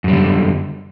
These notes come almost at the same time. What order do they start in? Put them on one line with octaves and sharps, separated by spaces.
F#2 G3 D3